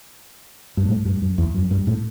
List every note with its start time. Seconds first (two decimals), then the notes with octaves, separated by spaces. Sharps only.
0.77 G2
0.89 A2
1.05 G2
1.22 F#2
1.38 E2
1.54 F#2
1.71 G2
1.87 A2